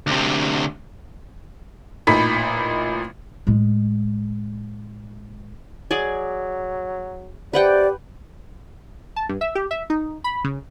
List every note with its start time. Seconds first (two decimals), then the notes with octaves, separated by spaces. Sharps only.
0.07 D2 C3
2.07 A1 A#2 D#4 B5 B6
3.47 A2 G#3
5.91 F#3 G#4 D5 G#5
7.53 C3 G4 B4 D5 F#5 G5
9.16 A5
9.29 G2
9.41 E5
9.55 G4
9.71 E5
9.90 D#4
10.24 B5
10.44 C#3